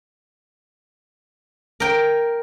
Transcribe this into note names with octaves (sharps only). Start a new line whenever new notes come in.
A#4 G5